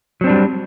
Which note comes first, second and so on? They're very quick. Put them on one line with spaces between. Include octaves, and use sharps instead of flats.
F#3 C4 D4 G3